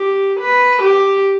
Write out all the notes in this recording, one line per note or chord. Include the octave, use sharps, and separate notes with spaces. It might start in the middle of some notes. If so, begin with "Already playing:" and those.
Already playing: G4
B4
G4